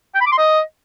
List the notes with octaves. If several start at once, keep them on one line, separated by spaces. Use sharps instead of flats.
G5
B5
D6
C6
D#5